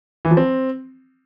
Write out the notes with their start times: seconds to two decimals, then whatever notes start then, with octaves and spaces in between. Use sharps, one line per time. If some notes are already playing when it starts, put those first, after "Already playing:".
0.25 E3
0.31 F3
0.37 C4